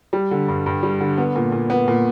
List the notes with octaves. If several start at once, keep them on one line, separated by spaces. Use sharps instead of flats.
G3
D3
G2
G2
G3
D3
B3
A#2
A#2
B3
A#2